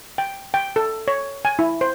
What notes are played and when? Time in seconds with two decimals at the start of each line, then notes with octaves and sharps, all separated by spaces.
0.18 G5
0.54 G5
0.76 A4
1.08 C#5
1.45 G#5
1.59 E4
1.81 C5